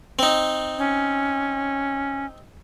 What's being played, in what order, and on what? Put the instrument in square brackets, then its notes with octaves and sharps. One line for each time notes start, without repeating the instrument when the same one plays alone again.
[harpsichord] C4 D#4
[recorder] C#4